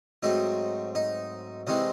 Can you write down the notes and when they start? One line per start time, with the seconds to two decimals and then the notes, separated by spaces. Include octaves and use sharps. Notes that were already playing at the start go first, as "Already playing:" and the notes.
0.23 G#2 F#3 A3 C4 D#4
0.95 D#4
1.67 C2 C3 E3 G#3 C4 D#4